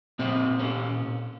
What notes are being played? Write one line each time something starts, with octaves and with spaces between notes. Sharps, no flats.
A#2 C4
C#4